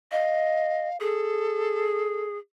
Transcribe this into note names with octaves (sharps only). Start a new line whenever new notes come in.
D#5 F5
G#4 A4